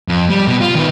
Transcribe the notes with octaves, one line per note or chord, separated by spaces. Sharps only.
F2
G3
B2
F4
D#3 B4